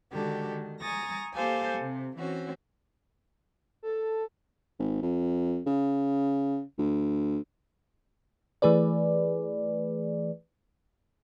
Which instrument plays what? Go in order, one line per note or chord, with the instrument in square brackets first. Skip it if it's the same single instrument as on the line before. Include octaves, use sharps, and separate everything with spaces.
[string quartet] D3 D#3 G#3 F#4 G4 A4
D#3
G#5 A#5 C#6 D#6 A6 A#6
A#3 G4 A4 C5 F5 G#5
C3
E3 C4 C#4 F#4
[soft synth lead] A4
[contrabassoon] G#1
F2
C#3
D2
[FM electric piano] E3 A3 G#4 B4 D5